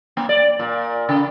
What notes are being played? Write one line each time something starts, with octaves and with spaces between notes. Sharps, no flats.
A#3
D5
A#2
C#3